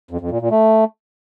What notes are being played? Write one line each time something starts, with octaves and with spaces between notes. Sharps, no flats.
F2
F2
A#2
A#2
A3